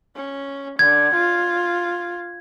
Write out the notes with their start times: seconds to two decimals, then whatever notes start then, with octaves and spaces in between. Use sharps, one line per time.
0.16 C#4
0.79 D3 G#6
1.14 F4